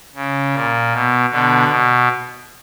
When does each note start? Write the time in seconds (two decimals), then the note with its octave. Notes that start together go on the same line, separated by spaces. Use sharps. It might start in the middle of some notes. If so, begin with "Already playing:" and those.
0.15 C#3
0.53 A#2
0.92 B2
1.30 B2 D3
1.68 B2